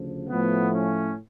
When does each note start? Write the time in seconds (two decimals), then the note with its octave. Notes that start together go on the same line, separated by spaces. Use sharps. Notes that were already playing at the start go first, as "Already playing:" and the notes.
Already playing: D2 C#3 F3
0.29 A2 F3 A3 B3
0.73 C#4